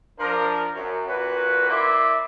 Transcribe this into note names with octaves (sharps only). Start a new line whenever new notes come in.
F3 D4 A#4
F#2
F#2 A#2 F#4 B4
A#3 E4 D5 E5 C6